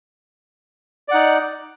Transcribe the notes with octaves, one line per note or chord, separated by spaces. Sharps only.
D#4 D5 F#5